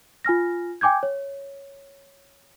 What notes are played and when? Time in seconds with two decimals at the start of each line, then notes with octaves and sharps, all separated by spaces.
0.25 F4 G#5 F6 A#6
0.81 G5 G#5 D6 G6 G#6
1.03 C#5